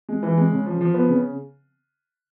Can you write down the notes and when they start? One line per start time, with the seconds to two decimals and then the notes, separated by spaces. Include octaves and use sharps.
0.09 G#3
0.23 E3
0.37 G#3
0.51 C#3
0.66 F3
0.81 F3
0.94 B3
1.09 C#3